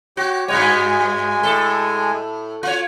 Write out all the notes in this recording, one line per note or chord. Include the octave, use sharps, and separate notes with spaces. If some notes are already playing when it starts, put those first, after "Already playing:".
F#4 G4 C#5
G2 G#3 F#4 C#5 G#5
A2 A4
F4 C#5